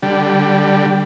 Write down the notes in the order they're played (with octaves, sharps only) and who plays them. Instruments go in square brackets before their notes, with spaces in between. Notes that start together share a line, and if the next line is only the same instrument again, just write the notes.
[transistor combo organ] D3 G3